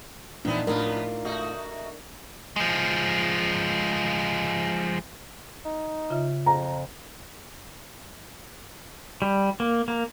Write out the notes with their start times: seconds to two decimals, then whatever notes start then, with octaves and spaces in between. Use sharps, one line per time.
0.45 F2 A#2 E3 B3 C4 D4 D#4
0.67 F2 A2 B3 D4 F4 A#4
1.25 A3 D#4 F#4
2.56 F3 G#3
5.65 D#4
6.10 C#3 F4 E5
6.46 F2 A#5
9.22 G3
9.60 A#3
9.88 A#3